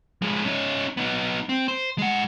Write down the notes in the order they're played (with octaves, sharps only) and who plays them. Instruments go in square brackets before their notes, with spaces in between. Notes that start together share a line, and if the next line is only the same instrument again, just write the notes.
[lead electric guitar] F3 G#3
C#4 D#4
B3 D#4
C4
C5
G#3 F#5